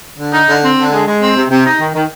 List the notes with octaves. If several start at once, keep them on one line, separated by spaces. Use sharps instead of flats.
D3
D#4
D3
C4
D3
G#3
G#3
C4
C3
C3
D#4
D#3
D#3